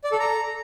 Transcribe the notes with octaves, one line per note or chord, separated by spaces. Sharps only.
D5
A4
A#5